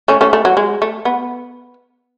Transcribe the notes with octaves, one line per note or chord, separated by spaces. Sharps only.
A3 C#4
A3 C#4
A3
F#3
G#3
A3
B3